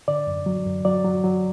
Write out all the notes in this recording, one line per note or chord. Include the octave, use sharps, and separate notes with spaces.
D3 D5
F#2
F#3
F#2
F#3 D5
F#3
F#3